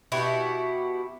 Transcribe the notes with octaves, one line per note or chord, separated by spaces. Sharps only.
B2 E4 F#4 G4